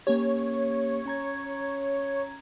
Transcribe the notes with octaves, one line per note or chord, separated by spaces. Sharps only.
A#3 C#4 G4 C#5
C#4 A#5 G#6